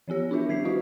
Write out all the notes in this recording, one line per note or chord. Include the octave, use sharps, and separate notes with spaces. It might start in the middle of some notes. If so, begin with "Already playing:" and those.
E3 F3 B3 G4 C#5
D4 E4 F4 A#4 E5
D#3 G3 A#4 G#6 B6 C7
E4 F#4 B4 D#5 F5